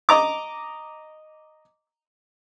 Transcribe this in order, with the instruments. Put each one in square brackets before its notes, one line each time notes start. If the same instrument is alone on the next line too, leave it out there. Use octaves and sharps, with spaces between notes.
[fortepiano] D#5 A#5 D6